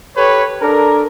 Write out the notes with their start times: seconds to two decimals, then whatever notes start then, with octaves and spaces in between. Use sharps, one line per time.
0.16 G4 A4 B4 C#5
0.61 D4 A4 A#4